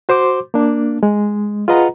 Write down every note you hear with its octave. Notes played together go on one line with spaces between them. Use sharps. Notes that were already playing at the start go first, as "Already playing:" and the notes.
F#4 C5 C6 D6
A#3 D4
G#3
F4 G#4 B4 D#5 F#5 A#5